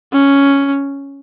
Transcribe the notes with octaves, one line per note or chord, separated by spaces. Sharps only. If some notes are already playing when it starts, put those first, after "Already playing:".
C#4